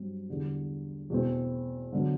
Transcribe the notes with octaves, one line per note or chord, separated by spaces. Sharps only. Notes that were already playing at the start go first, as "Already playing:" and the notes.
Already playing: G2 F#3 C4
E2 D3 G3
E2 B2 A3 C4
D3 F#3 B3